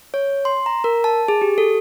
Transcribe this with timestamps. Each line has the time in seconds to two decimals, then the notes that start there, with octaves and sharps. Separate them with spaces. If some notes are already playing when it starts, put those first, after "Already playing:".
0.14 C#5
0.45 C6
0.66 A#5
0.84 A#4
1.04 A5
1.28 G#4
1.42 G4
1.58 A4